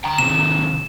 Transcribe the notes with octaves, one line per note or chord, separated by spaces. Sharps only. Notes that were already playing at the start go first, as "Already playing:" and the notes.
G5 A#5
C3 D#3 E7